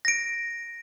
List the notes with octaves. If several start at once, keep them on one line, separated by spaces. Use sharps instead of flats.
A#6 D7